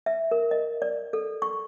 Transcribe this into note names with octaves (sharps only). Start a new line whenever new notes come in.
E5
A#4
D#5
D5
A4
C#6